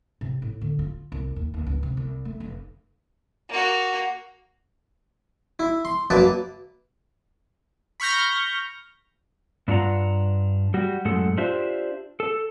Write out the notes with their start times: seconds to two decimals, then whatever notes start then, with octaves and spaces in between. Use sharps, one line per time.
0.21 C3
0.42 A2
0.61 D3
0.79 F4
1.12 C2
1.36 D#2
1.54 D#2
1.67 C#2
1.83 C3
1.97 C2
2.25 A3
2.40 F1
3.49 A#3 F#4
5.59 E4
5.85 C6
6.10 F#2 A#3 B4 D5 A5
8.00 B5 C#6 F6 G6 A#6
9.68 G2 D4 F4 F#5 A#5
10.74 G3 F#4
11.05 F#2 A2 G#3 A4 F#5
11.37 D4 F4 G4 C5 E5
12.20 A4